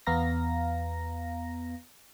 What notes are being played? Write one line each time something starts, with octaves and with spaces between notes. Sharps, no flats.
E2 B3 F5 A#5 A#6